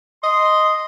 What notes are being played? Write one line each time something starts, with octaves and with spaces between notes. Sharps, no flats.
D#5 C6